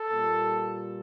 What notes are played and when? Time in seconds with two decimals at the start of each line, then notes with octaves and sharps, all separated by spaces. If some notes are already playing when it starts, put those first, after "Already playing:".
Already playing: A4
0.11 A#2 G3